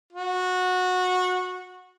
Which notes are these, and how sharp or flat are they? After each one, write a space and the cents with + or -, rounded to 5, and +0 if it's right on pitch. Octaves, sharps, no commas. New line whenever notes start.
F#4 -20